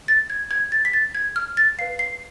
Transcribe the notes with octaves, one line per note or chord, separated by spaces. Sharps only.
A6
G#6
G#6
A6
B6
A6
G#6
F6
A6
B4 F5 C7
C7